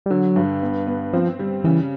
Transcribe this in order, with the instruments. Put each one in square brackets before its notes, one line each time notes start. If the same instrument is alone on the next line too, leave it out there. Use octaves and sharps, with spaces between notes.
[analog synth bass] G3
[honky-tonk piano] D3 [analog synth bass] F#3
[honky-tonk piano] G2
B3
B3
[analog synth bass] F3 [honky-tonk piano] C4
[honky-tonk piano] G3
[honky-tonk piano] C#3 [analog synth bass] E3